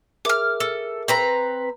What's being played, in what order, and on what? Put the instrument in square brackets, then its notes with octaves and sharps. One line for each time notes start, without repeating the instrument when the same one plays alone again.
[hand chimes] G#4 A#4 E5 [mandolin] D6 F6
[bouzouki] A4
C4 B4 A#5